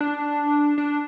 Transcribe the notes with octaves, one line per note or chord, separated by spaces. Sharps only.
D4
D4